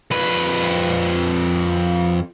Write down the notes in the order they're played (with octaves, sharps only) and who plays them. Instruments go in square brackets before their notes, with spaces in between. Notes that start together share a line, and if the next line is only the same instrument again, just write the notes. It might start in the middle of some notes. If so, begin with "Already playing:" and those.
[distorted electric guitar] F2 B4